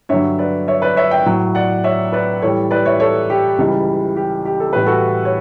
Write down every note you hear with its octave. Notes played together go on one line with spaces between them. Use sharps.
G2 D3 F#3 C#5 E5
B4 D5
C#5 E5
B4 D5
C#5 E5
E5 G5
A2 F#3
D5 F#5
C#5 E5
B4 D5
A2 E3 G3 A4 C#5
B4 D5
C#5 E5
A4 C#5
G4
C#2 C#3 E3 G3
G4
G4
A4
A2 E3 G3 B4
F#4 A4
C#5